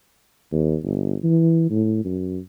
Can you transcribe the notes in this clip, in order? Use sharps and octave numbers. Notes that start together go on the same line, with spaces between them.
D#2
G1
E3
A2
F#2